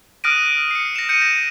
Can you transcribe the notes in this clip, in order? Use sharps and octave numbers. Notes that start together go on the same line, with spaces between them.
D#6 F6 F#6 A#6 D7 D#7
C7 C#7
A#6 E7
G6 C#7 D#7
A#6